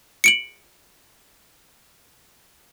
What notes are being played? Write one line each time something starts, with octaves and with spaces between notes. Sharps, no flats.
C#7 D7 F#7